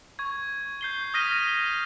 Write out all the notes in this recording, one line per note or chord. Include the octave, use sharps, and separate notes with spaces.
C#6 G#6
G6 C7 G7
D#6 F6 A#6 B6 D#7 G7